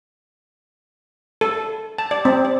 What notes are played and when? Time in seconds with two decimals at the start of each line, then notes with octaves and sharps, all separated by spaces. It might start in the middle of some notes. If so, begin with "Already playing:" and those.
1.41 A4
1.98 A5
2.11 D5
2.25 C4
2.45 D5